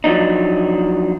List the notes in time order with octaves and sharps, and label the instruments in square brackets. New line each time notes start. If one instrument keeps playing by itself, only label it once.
[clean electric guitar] F3 F#3 D4 D#4